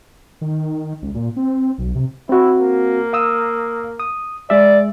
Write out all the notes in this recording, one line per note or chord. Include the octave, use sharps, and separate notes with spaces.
D#3
C#2
A#2
C4
B1
C3
C4 E4 F#4
A#3
F5 D#6 E6
D#6
G#3 G#4 D5 E5